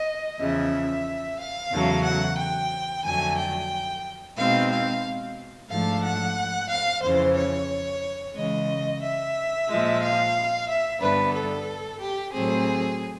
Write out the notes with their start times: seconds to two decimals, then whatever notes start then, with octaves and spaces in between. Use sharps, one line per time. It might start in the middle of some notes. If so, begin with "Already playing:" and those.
Already playing: D#5
0.39 E2 C#3 F3 E5
1.39 F5
1.72 E2 C#3 F#3 A3
2.04 F#5
2.37 G5
3.04 F2 D3 F#3 A3 G#5
3.38 G5
4.37 B2 G#3 C4 D#4 F5
4.71 F5
5.69 G#2 F3 A3 D4 F5
6.03 F#5
6.69 F5
7.02 F2 C#3 E3 C5
7.36 C#5
8.35 C#3 E3 G#3 D#5
9.02 E5
9.68 A#2 F3 G#3
10.02 F5
10.68 E5
11.01 G2 D3 G3 B3 D4 B4
11.34 A4
12.00 G4
12.33 A2 F#3 A3 C4 G#4